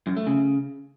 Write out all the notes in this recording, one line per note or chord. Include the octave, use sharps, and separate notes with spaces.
F#2
A3
C#3